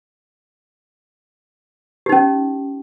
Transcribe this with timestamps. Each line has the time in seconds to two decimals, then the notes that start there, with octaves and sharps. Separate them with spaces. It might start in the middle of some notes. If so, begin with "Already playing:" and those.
2.06 G4
2.09 D#4
2.12 C#4